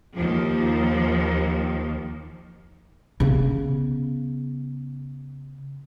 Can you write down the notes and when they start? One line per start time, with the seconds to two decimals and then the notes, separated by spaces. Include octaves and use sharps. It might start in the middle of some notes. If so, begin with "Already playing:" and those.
0.14 D#2 F3
3.20 C#3 B3